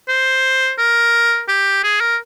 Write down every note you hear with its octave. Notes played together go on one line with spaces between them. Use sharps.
C5
A#4
G4
G#4
A#4